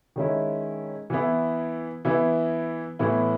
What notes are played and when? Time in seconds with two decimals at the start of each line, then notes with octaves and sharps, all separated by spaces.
0.16 D#3 G#3 C#4 E4
1.10 E3 B3 E4
2.05 E3 B3 E4
2.99 A2 E3 B3 E4